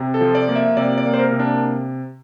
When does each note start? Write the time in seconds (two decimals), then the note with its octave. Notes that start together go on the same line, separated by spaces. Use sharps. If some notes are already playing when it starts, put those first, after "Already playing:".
Already playing: C3
0.14 A4
0.21 F3
0.35 D5
0.49 A#3
0.56 E5
0.77 C3 D5
0.98 D5
1.05 A#3
1.14 C5
1.19 A#4
1.32 C3
1.40 D4